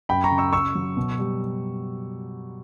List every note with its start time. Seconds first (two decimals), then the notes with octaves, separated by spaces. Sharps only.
0.09 F#2 G5 B5
0.24 A#5 C#6
0.31 C#3
0.38 C#6 E6
0.53 C#3 C#6 E6
0.75 F#3
0.97 B2
1.19 G3